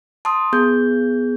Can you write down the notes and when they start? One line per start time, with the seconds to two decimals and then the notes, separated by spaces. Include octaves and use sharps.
0.25 A5 C6 D#6
0.53 B3 G#4 G6